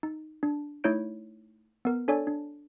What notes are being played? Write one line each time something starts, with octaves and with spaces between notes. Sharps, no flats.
D#4
D4
A3 D#4 E4 C#5 G6 D7
B3 A#4
D4 A4 C#5 D5 G#5
D4